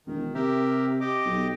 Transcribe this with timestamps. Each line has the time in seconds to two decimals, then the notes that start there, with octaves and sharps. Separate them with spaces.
0.07 E1 D#3
0.35 C3 G4 A#4 E5
1.00 G4 D#5 D6
1.25 B1